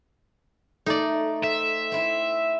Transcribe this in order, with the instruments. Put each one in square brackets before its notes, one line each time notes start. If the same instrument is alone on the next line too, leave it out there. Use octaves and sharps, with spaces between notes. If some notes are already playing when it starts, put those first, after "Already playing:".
[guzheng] A3 [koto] D#4 D5
[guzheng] C4 [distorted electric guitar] E5
[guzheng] C4 E4